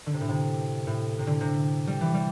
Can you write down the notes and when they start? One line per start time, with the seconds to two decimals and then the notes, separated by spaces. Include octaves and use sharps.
0.06 D3
0.14 C3
0.21 A2
0.29 C3
0.87 A2
1.19 C3
1.27 D3
1.41 C3
1.87 G3
2.01 E3
2.14 G3